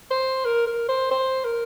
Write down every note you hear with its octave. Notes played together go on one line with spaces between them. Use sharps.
C5
A#4
A#4
C5
C5
A#4